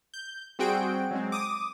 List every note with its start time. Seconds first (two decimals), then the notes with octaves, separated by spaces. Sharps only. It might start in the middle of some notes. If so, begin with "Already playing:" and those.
0.14 G6
0.59 G3 C4 F#4 G#4 G5 D7
1.11 F#3 G#3 C4
1.32 D6 D#6